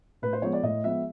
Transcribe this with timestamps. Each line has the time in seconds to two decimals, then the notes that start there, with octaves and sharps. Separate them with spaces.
0.22 A2 B4
0.33 C5
0.42 F3 G#3 B3 C#5
0.53 D5
0.63 A2 D#5
0.84 F3 G#3 B3 E5